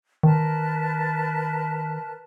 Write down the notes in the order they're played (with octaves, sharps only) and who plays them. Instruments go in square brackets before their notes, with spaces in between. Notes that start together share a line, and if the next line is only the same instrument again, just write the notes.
[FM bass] D#3 [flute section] A#4 B4 A5